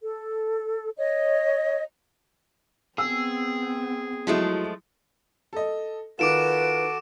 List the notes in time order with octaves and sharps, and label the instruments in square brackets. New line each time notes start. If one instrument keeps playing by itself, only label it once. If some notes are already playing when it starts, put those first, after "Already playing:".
[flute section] A4
C#5 D#5
[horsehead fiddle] B3 C4 [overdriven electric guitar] G#4 [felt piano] E6
[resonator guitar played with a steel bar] F3 G#3 A3 [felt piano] F#3 E4
[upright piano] A4 D#5
[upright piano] D#3 F4 [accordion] F#4 A4 [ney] B4 [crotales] D6 D7 E7